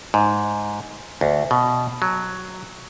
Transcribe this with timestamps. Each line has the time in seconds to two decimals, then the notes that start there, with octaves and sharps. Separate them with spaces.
0.14 G#2
1.21 D2
1.51 B2
2.02 F#3